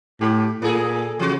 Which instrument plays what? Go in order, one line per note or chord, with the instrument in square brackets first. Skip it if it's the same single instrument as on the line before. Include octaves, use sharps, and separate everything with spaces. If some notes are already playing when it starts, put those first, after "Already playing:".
[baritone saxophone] A2 [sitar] G4
[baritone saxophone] A#2 [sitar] A#3 G#4 A4
[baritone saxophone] C#3 [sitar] E3 F#4